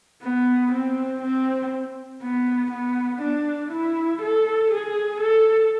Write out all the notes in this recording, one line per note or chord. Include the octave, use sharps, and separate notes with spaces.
B3
C4
C4
B3
B3
D4
E4
A4
G#4
A4